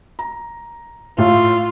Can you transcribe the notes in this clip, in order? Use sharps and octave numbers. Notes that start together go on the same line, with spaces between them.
A#5
A2 A3 F4 F5